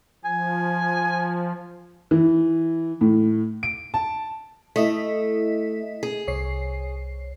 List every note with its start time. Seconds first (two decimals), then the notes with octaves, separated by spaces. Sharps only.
0.25 F3 G#5
2.11 E3
3.01 A2
3.63 D7
3.94 A5
4.76 A3 E4 D#5 B6
6.03 G#4
6.27 C2 C#5 C7